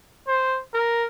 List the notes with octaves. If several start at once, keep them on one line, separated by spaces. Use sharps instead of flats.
C5
A#4